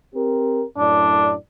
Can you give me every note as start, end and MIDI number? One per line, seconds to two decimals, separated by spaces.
0.14 0.64 60
0.14 0.64 67
0.14 0.64 70
0.77 1.34 42
0.77 1.34 45
0.77 1.32 62
0.77 1.34 74